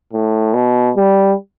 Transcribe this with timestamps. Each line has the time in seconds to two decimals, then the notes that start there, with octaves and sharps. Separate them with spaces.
0.13 A2
0.54 B2
0.97 G3